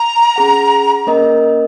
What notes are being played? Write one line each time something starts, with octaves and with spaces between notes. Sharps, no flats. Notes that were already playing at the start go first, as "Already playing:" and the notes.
Already playing: A#5
C#4 G#4 F#5
A#3 C#4 A#4 D#5